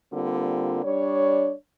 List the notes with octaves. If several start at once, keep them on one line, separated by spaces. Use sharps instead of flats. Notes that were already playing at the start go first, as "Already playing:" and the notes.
D3 G3 A#3 C4 F4
G3 D4 C#5